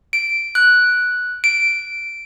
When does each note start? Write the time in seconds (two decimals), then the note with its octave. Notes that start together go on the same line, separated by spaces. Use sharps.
0.13 D7
0.55 F#6
1.44 D7